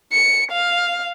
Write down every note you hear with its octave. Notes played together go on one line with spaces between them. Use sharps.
C#7
F5